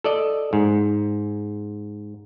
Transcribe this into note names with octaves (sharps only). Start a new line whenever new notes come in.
A4 D5 D#5
G#2